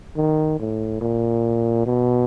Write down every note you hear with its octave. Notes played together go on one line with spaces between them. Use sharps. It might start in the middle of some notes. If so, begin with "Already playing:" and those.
D#3
A2
A#2
B2